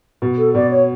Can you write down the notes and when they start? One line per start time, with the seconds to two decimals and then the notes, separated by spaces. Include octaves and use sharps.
0.22 B2
0.38 A4
0.55 B2 D5
0.71 C#5